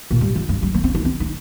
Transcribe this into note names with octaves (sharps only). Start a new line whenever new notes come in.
A#2
G2
F2
G2
G3
A#3
C4
D#4
C4
D#4